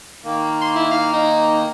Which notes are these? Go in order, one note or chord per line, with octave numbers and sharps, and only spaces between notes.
D#3 A#3
C6
E4
F5
D#4